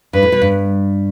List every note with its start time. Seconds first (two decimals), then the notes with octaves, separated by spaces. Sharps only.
0.13 G2 B4
0.23 A2
0.32 B2
0.42 G2